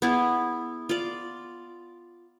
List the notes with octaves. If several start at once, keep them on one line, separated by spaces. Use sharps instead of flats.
B3 E4 G#4
F4 D5